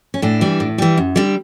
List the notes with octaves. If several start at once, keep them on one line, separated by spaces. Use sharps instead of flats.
C#4
A2 D4
E3 G3
A2
E3 G3
F#2
D3 G3